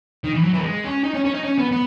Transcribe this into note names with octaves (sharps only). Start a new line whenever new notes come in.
D#3
E3
F#3
E3
A#3
G#3
C#4
D#4
C#4
C#4
D#4
C#4
B3
B3